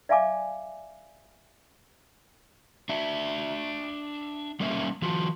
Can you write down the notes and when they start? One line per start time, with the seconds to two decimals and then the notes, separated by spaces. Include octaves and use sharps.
0.09 D5 E5 F5 G#5 A5 D6
2.89 D4 E5
4.60 G3 A#3 C#4 E5
5.02 E3 F4 F#4